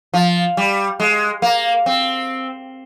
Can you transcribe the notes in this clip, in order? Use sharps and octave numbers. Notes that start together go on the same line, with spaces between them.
F3
G3
G#3
A#3
C4